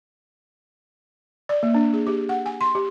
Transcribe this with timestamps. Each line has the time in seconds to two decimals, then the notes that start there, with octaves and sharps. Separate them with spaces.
1.49 D5
1.63 A#3
1.74 D4
1.93 G#4
2.07 G4
2.29 F#5
2.46 G#5
2.61 C6
2.75 G4